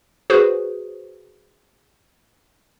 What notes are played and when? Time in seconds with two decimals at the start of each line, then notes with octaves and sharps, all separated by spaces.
0.30 F#4 G#4 B4 C5